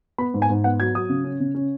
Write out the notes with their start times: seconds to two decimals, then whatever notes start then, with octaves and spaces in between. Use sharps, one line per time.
0.18 B3 B5
0.34 G#2
0.42 G#5
0.50 G#2
0.64 B3 F#5
0.80 F#3 G#6
0.95 F#3 D#6
1.09 C#3
1.24 C#4
1.40 C#3
1.55 C#4